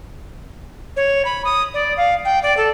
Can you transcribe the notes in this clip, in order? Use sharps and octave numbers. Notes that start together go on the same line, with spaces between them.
C#5
B5
D#6
D5
F5
G5
D5
A4